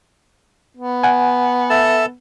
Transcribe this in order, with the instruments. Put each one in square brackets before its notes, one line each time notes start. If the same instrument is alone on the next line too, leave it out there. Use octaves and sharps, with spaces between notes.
[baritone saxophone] B3
[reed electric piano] F#5 G#5
[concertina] A4 A5 [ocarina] E5